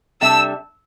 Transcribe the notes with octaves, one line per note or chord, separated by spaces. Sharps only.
C3 G3 D4 A4 E5 E6